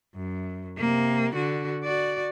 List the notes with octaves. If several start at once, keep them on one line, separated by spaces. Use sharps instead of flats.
F#2
C3 A#3
D3 F#4
F#4 D5